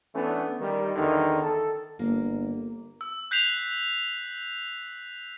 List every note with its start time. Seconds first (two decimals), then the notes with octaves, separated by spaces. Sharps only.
0.14 E3 A3 B3 C#4 D4
0.60 D#3 G3
0.95 E2 D3 D#3
1.42 A4
1.99 G1 A#3
3.01 E6
3.31 F#6 G6 B6 C7 F7 F#7